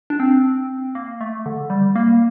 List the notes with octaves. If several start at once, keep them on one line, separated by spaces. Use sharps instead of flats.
D4
C4
A#3
A3
D3
G3
A#3